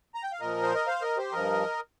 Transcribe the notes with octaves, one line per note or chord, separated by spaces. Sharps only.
A#5
G5
F5
A#2 F3 A#4 D#5
C5
D#5
C5 F5
A#4 D#5
G4 C5
G2 F3 A#4 D#5